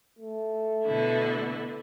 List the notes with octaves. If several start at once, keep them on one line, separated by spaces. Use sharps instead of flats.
A3
B2 D3 E4